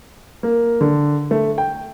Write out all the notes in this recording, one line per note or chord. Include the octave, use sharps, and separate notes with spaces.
A#3
D3
A3
G5